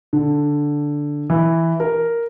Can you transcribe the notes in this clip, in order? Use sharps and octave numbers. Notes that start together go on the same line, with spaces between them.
D3
E3
A#4